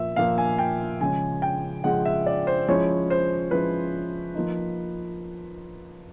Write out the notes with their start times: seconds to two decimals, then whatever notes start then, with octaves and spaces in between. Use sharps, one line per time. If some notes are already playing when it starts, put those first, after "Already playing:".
Already playing: A#2 F3 A#3 E5
0.16 A#2 F3 A#3 F5
0.38 G#5
0.59 G5
1.01 C#3 F3 G#3 C#4 G#5
1.42 G5
1.84 C#3 F3 G#3 C#4 F#5
2.05 E5
2.26 D5
2.47 C5
2.68 F3 G#3 C#4 E4 C#5
3.10 C5
3.51 F3 G#3 C#4 E4 B4
4.35 F3 A#3 D#4